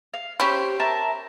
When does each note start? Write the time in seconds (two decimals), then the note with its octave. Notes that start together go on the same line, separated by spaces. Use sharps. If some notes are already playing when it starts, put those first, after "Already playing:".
0.14 F5
0.40 C#4 E4 G4 C5 G5
0.80 A#4 E5 A5